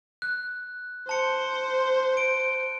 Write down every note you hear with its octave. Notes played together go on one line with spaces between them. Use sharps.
F#6
C5 A5 C#7
D7